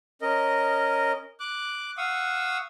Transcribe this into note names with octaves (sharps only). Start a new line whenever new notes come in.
C#4 A#4 D#5
D6 F#6
F5 F#5 C#6 D#6 E6